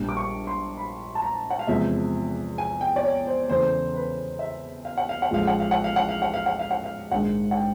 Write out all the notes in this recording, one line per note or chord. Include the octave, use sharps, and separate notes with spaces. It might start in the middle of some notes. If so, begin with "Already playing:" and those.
Already playing: A#1 A#2 G3
D6
C#6
C6
B5
A5
A#5
F#5
F5
E2 C3 F3 G#3 E5
G#5
G5
D5
C#5
C5
E2 C#3 E3 A3 C5
B4
E5
F5
F#5
F5
F#5
A1 A2 F3 G#3 F5
F#5
F5
F#5
F5
F#5
F5
F#5
F5
F#5
F5
F#5
F5
A#1 G#2 D#3 G#3 F#5
F#5
G5